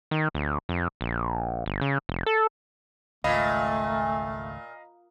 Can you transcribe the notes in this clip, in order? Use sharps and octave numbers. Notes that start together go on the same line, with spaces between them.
D#3
D2
F2
A#1
G1
C#3
F1
A4
G#1 C#2 A#2 A3 D#5 F5 B5